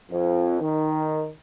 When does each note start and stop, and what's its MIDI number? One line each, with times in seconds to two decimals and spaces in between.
0.10 0.59 41
0.59 1.29 51